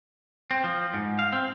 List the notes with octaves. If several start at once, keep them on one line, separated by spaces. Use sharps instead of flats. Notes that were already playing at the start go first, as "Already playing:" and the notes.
C4
F3
G#2
F5
C4